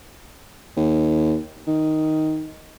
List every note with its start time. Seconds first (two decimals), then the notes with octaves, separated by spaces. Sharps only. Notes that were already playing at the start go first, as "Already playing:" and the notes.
0.77 D#2
1.67 D#3